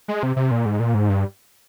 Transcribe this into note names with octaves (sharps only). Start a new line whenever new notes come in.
G#3
C3
C3
A#2
G#2
A#2
G#2
G2